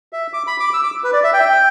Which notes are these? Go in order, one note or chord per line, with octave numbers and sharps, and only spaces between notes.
E5
D6
B5
D6
E6
D6
B4
D5
E5
G5
E5
G5